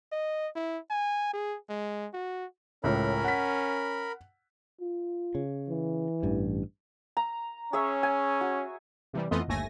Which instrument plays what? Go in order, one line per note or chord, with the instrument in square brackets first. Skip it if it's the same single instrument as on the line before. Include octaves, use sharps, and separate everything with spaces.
[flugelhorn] D#5
E4
G#5
G#4
G#3
F#4
[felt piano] C#2 A2 [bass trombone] C#4 [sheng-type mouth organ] A#4 B5
[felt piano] F#5 B6
[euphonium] F4
[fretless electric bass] C#3
[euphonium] E3
[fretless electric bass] A1 G2
[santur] A#5
[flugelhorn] C#4 [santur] G#4 C#5 E5
[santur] G#5
F#4
[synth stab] C3 E3 G3
F2 E3 A3 B3 F4 D#5
G1 D#2 A3 G#5 A#6